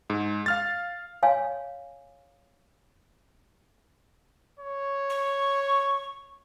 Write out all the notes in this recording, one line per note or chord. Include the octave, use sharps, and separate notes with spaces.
G#2
F5 F6 A6
C#5 F5 G#5
C#5
C#6